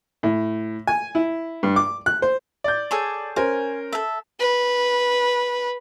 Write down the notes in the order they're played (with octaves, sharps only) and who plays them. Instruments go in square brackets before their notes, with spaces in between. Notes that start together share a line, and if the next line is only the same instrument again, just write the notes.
[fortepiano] A2
G#5
E4
G2
D6
F#6
C5
[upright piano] D5 G6
[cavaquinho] G#4 A4 C#5
[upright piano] C#4 A#4 C5 [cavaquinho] G#5
[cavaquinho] A4 E5
[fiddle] B4